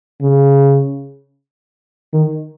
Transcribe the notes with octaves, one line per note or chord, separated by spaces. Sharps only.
C#3
D#3